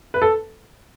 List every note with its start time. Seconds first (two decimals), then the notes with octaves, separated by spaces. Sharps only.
0.14 B4
0.22 A4